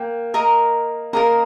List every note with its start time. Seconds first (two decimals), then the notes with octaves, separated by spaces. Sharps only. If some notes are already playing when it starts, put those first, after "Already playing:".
Already playing: A#3 G5
0.34 A#4 D#5 A#5
1.13 A#3 A#4 D#5 A#5